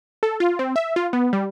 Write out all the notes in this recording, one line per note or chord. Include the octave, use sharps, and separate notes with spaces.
A4
F4
C4
E5
F4
B3
G3